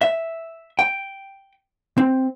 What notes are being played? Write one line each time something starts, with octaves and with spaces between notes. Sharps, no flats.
E5
G5
C4